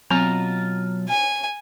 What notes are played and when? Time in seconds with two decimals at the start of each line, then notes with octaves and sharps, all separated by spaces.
0.10 B2 F#3 C4 F4 A#5
1.09 G#5